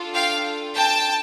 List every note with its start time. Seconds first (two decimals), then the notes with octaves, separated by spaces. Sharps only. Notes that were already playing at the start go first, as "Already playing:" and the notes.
Already playing: D4 F4 A4
0.14 F5 G5
0.76 G5 A5